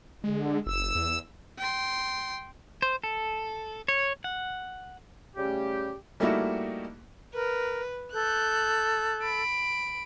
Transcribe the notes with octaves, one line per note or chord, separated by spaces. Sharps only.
D3 G#3
F#1 E6
E2
G5 C6
C5
A4
C#5
F#5
C#3 G3 A3 C#4 G4
G3 A3 A#3 D#4 E4 F#4
A#4 B4
A4 F#6 G6
B5 D7